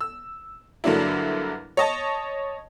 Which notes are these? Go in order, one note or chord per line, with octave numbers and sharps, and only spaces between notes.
E6
G2 D3 F#3 A#3 D4 E4
C#5 D#5 A5